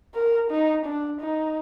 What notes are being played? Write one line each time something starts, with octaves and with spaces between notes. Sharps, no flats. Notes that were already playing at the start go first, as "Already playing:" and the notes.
A#4
D#4
D4
D#4